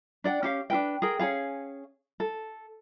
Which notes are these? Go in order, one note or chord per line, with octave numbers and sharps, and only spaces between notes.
D4 D5 F#5 G5
C#4 G4 F5
D4 F4 B4 G5
G#4 A#4 G5
C#4 F4 G#4 F5
A4